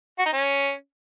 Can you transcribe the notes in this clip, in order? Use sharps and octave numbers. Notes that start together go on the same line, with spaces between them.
F#4
D#4
C#4